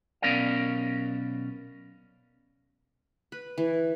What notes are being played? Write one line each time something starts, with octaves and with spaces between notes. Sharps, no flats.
B1 B3 C#4 A#4 D5 F5
B4
E3